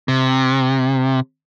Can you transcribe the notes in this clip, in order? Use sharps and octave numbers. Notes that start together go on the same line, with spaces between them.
C3